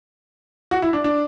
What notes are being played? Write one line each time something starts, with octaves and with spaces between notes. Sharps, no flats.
F#4
E4
D4
D4